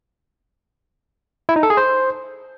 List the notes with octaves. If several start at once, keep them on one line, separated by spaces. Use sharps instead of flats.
E4
D#4
A4
G#4
C5